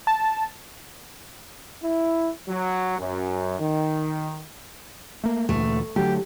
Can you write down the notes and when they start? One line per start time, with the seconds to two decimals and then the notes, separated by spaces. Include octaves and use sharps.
0.07 A5
1.83 E4
2.49 F#3
2.99 F#2
3.60 D#3
5.24 A3 A#3
5.49 D2 A#2 E3 A3
5.96 D3 F#3 A3 G4